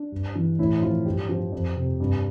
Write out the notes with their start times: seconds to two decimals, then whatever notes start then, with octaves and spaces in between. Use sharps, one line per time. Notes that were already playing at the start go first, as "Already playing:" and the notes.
Already playing: D4
0.12 G2
0.35 E3
0.59 A2 E4
0.82 F3 F4
1.05 G2 G4
1.29 F3
1.52 F2
1.76 C3
2.00 G2